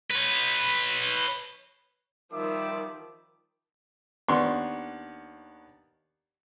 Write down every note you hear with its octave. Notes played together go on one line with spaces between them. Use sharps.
B4 C#5
D#3 F3 G3 E5 D6
D#2 B3 D4 C6 C#6